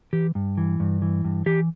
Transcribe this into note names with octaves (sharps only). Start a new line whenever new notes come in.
E3 G4
G2
E3
G2
E3
G2
E3 G4